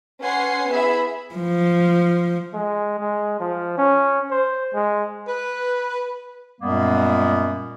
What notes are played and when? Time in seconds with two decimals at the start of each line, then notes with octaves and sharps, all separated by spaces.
0.21 C#4 B4 F#5 G#5 C6 C7
0.71 B3 E4 G#4 E5 B5
1.35 F3
2.54 G#3
3.00 G#3
3.40 F3
3.78 C#4
4.31 C5
4.74 G#3
5.28 B4
6.61 F#2 A#2 G3 G#3 A#3 B3